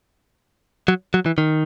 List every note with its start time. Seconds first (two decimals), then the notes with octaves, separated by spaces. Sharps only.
0.88 F#3
1.14 F#3
1.26 E3
1.38 D#3